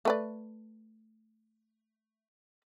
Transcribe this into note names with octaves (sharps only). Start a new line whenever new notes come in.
A3 B4 D5